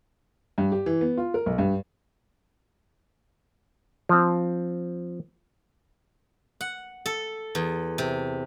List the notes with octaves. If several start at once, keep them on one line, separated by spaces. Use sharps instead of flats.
G2
G4
E3
B3
F4
A#4
B1
G2
F3 C4
F#5
A4
E2
C3